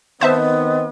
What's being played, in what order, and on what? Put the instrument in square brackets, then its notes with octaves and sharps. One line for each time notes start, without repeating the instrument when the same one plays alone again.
[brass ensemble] D#3 C4 D#5 [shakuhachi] B3 [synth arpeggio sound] C5 E5 A5